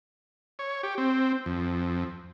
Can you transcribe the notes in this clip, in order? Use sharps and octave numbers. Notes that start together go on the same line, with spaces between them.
C#5
G4
C4
F2